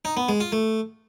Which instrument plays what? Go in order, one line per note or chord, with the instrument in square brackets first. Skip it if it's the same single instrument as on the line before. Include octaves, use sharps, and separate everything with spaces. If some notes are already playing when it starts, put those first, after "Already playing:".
[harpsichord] D#4
B3
G#3
F4
A3